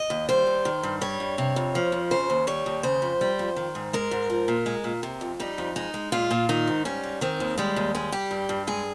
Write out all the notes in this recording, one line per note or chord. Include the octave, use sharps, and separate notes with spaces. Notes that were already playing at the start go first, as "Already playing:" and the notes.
Already playing: D#5
D#2
G3 C5
D#2
D#3
G2
G3 C#5
G2
C3
F2
F3
F2
C#3 C5
D#2
G3 C#5
D#2
C#3 C5
F2
G3
F2
D#3
G#2
G#3 A#4
G#2
F3
A#2
G#3
A#2
C3
F2
G3 D#4
F2
G#3 D#4
G#3
A#2 F4
A#2
D#3 D#4
G#2
G3 C#4
G#2
D#3 C4
D#2
G3 G#3
D#2
G3 G#3
G3 G4
G2
G2
G#3 G#4